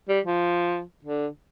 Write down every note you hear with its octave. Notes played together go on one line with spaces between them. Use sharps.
G3
F3
D3